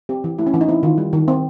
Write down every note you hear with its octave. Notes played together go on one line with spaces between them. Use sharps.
C4 G4
E3
A3 E4
C#4
E3 D4
D#4
C4 E4
D#3 F4
G3
D#3
C4